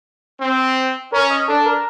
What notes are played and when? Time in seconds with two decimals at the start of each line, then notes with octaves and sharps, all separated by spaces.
0.41 C4
1.12 C#4 A#4
1.30 D#5
1.48 D4 A4
1.66 A#4